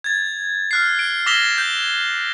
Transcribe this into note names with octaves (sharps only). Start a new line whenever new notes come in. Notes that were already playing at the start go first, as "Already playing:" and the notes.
G#6 A6
F6 F#6 C7
D7
D6 E6 A#6 B6 F7 G7
G6